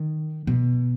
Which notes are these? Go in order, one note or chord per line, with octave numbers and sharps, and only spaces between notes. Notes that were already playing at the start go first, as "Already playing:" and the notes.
Already playing: D#3
B2